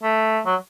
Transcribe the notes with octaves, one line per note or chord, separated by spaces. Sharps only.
A3
F#3